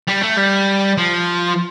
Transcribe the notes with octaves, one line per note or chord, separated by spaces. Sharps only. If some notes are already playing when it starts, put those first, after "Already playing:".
G3
A3
G3
F3